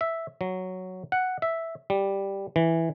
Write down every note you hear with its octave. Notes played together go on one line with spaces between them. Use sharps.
E5
F#3
F#5
E5
G3
E3